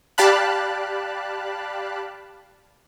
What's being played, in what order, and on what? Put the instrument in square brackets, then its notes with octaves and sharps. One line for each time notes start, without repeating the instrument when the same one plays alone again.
[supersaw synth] G4 D5 F5 A5 B5 F#6